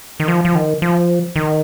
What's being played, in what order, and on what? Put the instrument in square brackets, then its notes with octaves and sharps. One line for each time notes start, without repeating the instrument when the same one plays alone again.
[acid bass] D#3
F3
F3
D#3
F3
D#3